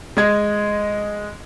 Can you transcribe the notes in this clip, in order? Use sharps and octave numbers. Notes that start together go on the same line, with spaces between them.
G#3 D#5 G#6